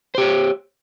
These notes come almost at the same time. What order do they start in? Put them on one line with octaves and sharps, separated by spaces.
C5 G4 C#5